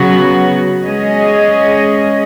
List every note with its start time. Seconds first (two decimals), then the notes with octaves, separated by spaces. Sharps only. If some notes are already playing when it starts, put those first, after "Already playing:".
Already playing: C#3 F#3 B3 F#4
0.84 G#3 C#4 G#4 D#5